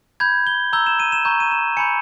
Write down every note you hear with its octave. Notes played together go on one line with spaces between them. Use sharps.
B5 G6 G#6
G7
A#5 E6 G6 G7
E7
D#7
E7
A#5 C#6 G6
D#7
E7
G#5 B5 G6 C#7